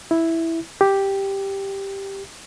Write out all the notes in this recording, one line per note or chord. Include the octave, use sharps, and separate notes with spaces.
E4
G4